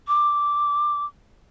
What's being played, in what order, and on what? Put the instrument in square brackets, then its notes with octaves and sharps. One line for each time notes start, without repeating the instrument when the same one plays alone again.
[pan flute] D6